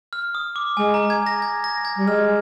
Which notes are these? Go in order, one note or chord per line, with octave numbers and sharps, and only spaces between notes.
F6
D#6
D6
G#3 G#5
A#5
G#6
A#6
G#6
A#6
G#6
G3
G#3 F6